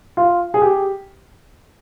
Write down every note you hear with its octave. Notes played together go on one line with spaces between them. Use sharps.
F4
G#4
G4